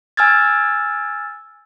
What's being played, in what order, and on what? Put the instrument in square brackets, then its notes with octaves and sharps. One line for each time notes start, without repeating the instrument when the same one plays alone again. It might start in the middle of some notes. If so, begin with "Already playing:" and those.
[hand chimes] G#5 E6 F6 G#6 A6